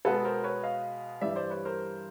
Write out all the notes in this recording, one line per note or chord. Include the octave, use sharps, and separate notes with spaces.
B2 G#3 B3 A4 B4
A#4 C5
B4 C#5
D#5 F5
G2 E3 G3 D5 E5
C5 D5
B4 C#5
A#4 C5